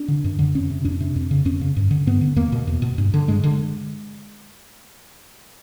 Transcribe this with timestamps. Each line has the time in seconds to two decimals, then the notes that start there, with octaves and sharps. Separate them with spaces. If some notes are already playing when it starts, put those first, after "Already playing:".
Already playing: D4
0.08 D3
0.24 F#2
0.39 D3
0.55 F2 C#4
0.70 C3
0.85 F2 D4
1.00 C3
1.16 F2
1.31 C#3
1.45 F2 C#4
1.61 C#3
1.76 G2
1.91 D3
2.07 G2 B3
2.21 D3
2.36 E2 A#3
2.52 B2
2.67 E2
2.82 B2
2.98 G2
3.14 D3
3.28 G2 G#3
3.43 D3